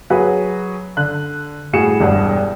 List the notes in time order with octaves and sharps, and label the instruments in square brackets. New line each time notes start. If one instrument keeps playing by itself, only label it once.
[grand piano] F#3 F#4 G#4 B4
D3 F#6
A2 G3 F#4 G#4 C#7 E7
E1 G2 G3 F#5